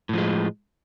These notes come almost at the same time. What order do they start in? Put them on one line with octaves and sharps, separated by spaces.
A2 F3 G#3